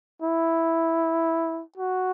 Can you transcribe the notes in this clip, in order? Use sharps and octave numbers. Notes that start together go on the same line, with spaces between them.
E4
F#4